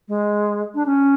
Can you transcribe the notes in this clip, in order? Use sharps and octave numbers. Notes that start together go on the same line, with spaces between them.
G#3
D4
C#4